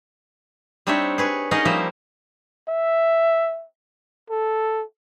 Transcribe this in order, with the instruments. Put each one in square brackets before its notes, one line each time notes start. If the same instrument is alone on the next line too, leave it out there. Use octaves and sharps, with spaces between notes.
[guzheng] G3 C4 D4 D#4 C#5 E5
G#4 B4 C#5
C#4 D#4 G#4 A#4 D#5 F#5
F3 G3 A#3 C5 E5
[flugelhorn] E5
A4